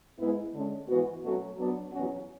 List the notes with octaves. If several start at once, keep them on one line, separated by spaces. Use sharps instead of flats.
G#2 G#3 B3 E4
D3 G#3 C#4
G#2 E3 B3 F#4
B2 F#3 A3 C#4 F#4
F#3 B3 D4
E2 B2 F#3 C#4 F#4